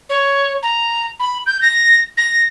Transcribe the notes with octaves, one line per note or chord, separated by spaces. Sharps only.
C#5
A#5
B5
G6
A#6
A#6